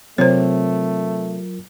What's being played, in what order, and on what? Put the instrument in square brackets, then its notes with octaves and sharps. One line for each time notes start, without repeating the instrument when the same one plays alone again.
[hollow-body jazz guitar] C3 [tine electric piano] F#3 F4 A#4 [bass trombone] A3 [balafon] C5 C#5